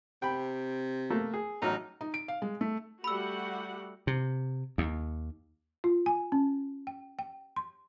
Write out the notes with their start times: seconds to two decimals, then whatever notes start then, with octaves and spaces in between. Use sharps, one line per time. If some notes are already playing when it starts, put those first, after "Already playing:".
0.22 C3 G5 B5
1.10 A3 A#3
1.34 G#4
1.62 A1 F#3 D#4 F6
2.01 D#4
2.14 D7
2.28 F5
2.42 G#3
2.61 A3
3.04 G3 A3 F#4 G4 F#5 B5 E6
4.07 C3
4.78 D#2
5.84 F4
6.06 G#5
6.32 C#4
6.87 G5
7.19 G5
7.56 C6